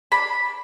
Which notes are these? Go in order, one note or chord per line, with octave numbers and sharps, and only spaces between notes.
D4 B5